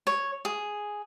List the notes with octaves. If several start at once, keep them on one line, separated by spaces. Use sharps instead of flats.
C#5
G#4